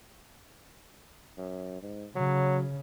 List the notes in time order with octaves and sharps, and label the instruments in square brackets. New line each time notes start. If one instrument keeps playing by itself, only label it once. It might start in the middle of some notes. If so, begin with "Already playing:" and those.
[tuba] F#2
G#2
[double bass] C#3 [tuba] F#3